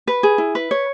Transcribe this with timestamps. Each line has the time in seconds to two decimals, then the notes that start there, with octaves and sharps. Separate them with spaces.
0.07 B4
0.23 G#4
0.38 E4
0.55 B4
0.71 C#5